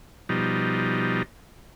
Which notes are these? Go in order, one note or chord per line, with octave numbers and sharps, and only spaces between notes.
B2 F3 G3 D#4